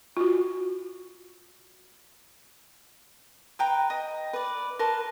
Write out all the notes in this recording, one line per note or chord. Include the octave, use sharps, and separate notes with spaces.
F4 F#4
B4 G5 A#5
D#5
B4 D5
A#4 B4 A5 C6